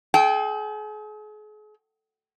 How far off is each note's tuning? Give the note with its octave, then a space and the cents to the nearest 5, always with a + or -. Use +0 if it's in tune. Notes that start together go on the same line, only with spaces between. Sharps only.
G#4 +40 G5 +0